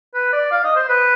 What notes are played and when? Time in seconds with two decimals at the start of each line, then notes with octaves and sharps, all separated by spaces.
0.14 B4
0.33 D5
0.51 F5
0.64 D#5
0.76 C5
0.89 B4